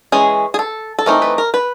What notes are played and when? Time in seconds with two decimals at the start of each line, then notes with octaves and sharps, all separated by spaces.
0.12 E3 G#3 C#4 G#4
0.54 G#4
0.59 A4
0.99 A4
1.06 E3 A3 C4 D#4 A#4
1.22 B4
1.38 A#4
1.54 B4